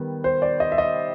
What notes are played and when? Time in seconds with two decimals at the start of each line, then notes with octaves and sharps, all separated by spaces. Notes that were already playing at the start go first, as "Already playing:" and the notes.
Already playing: D#3 G3 B3
0.24 C5
0.42 D5
0.60 D#5
0.72 E5
0.78 D#5